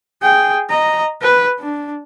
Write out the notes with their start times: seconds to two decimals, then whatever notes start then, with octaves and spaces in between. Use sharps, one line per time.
0.22 G#4 G5
0.70 D#5 A#5
1.22 B4
1.60 D4